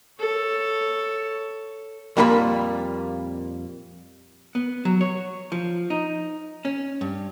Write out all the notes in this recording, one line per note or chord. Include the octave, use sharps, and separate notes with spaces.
A4 C#5
F2 A#2 G3 A#3 G#4 B5
B3
F#3
C#5
F3
D#4
C#4
G2